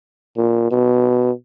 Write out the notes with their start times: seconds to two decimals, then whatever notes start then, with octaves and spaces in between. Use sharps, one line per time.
0.37 A#2
0.71 B2